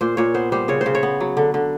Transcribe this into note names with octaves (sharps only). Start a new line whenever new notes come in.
A#2 C5
A#2 C#5
B3 C5
G3 C5
C#3 C#5
C5
C#3
C#5
B3
F#3
D3
D3